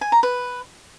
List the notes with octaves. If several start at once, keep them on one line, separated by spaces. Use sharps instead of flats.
G#5
A#5
B4